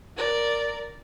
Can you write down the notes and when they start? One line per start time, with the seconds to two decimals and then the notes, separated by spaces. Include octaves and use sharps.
0.17 A#4 D5